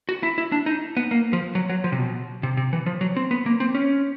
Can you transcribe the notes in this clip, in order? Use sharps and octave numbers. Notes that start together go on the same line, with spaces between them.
F#4
E4
E4
D4
D#4
B3
A#3
F3
F#3
F#3
F3
C3
B2
C3
C3
E3
F3
F#3
C4
B3
A#3
C4
C#4